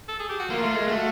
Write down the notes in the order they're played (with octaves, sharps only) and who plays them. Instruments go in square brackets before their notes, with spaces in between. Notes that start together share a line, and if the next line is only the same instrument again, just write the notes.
[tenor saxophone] A4
G#4
G4
F#4
[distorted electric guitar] A#3 [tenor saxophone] F4
[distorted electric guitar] A3
G#3
[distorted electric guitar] A3 [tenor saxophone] F#4